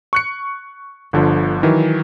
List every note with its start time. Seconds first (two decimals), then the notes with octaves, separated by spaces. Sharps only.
0.13 C#6 F#6 C#7
1.13 G1 D3 F3
1.63 D#3 E3 F#3